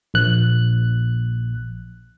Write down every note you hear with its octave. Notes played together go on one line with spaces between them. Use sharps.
A#1 F#6